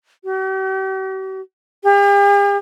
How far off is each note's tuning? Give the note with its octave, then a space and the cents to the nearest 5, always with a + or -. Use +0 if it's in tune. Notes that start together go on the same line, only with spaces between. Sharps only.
G4 -45
G4 +45